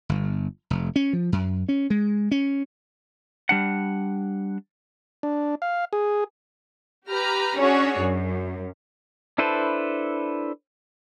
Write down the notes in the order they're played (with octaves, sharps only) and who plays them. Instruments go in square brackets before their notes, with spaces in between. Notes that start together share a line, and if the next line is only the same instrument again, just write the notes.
[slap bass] G1
F1
C#4
F3
F#2
C#4
G#3
C#4
[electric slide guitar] G3 D4 F#5
[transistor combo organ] D4
F5
G#4
[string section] G4 B4 A#5 F6
C#4 D4 F#4 G#4 C#5
F#2
[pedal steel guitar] D4 E4 A4 B4 C5